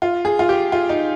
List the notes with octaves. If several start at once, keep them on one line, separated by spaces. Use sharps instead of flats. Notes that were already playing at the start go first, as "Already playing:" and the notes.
F4
G#4
F4
G4
F4
D#4